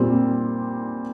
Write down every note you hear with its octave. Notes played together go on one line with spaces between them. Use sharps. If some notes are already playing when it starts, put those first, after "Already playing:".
Already playing: A#2 G3 C4